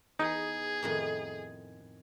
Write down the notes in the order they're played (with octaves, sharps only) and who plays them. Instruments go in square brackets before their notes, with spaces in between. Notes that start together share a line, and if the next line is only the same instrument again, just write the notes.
[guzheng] E2 [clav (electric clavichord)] D#4 [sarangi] G#4
[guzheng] F2 A2 D#3